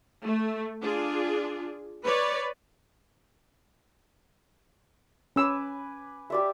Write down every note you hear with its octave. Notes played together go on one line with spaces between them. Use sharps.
A3
D4 F4 G#4
B4 C#5 D5
C#4 B4 G#5 D6 E6
G4 D5 E5